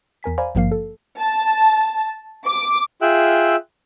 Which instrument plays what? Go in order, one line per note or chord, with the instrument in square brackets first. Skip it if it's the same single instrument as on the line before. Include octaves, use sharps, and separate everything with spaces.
[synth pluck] E2 A#4 G#5 B6
C5 D5 F5 G#5 A#5 B5
G#1 G2 F3 A#3 F5 C7
A4
[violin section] A5
D6
[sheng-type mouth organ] F4 G#4 E5 G5 E6 F#6